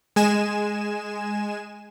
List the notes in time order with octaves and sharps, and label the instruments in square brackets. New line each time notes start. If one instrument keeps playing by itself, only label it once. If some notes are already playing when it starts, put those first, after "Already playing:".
[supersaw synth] G#3 G#5 E7